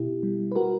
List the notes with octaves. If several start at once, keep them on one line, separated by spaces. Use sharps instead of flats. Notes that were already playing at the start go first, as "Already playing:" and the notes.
Already playing: B2 E4 G4
G3
B4
F#4 A#4